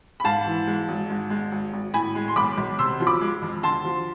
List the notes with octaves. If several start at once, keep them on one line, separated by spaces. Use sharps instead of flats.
B5
G#2 F5 A5
E3
G#3
G#1
G#2
G#3
G#1
G#1
A2 G#5 B5
G#3
C6
B1 B5 D6
B1
C3 C6 E6
F3
B5 D6
G#3
F2
D3 A5 C6
F3